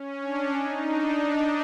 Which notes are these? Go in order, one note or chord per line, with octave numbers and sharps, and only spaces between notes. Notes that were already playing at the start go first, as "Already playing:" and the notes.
Already playing: C#4
D4
D#4
D4